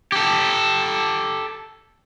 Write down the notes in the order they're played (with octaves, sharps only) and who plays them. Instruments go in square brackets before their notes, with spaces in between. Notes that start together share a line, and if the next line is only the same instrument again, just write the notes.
[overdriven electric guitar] G4 A4